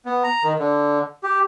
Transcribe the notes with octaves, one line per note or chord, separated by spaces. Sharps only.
B3
A#5
D#3
D3
G4